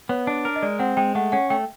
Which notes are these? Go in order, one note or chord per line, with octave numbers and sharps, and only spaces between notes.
B3 C#5
D4
A#4
D#5
G#3 D5
C4 F#5
G#3 G5
A3 F#5
C#4 F#5
A3 G5